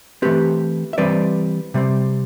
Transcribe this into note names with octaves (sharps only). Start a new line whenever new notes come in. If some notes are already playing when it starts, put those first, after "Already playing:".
E3 A3 C4 G4 B4
E5
E3 G3 C4 B4 D5
C3 G3 C4